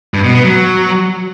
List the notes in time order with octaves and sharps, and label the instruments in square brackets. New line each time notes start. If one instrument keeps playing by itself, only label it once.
[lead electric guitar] G2
B2
B3
F#3